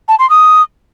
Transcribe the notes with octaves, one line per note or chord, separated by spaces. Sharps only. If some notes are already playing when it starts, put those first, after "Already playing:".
A5
C6
D#6